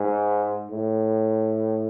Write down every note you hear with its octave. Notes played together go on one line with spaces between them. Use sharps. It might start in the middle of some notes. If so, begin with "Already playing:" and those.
Already playing: G#2
A2